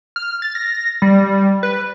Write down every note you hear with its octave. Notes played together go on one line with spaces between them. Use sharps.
F6
A6
A#6
G3
B4